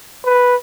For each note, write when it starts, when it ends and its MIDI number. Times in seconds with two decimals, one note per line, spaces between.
0.25 0.56 71